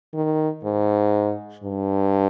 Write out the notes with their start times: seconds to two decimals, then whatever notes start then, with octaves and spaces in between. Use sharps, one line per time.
0.14 D#3
0.64 G#2
1.64 G2